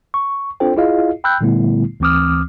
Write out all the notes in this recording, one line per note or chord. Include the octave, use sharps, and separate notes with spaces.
C#6
C4 D4 F4 A4 C5 G5
E4 F4 G#4 D#5 F5
G5 B5 E6 F#6 G6
A#2 D3 G3 A3 B3 E4
D2 E3 C4 D6 D#6 F6